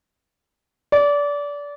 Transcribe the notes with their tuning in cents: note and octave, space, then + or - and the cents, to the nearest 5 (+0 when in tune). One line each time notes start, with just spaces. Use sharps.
D5 -25